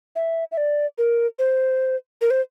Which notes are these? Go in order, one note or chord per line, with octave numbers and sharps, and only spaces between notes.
E5
E5
D5
A#4
C5
A#4
C5